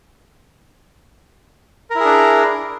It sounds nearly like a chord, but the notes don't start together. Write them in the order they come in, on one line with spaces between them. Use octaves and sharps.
A#4 E4 G#4 D4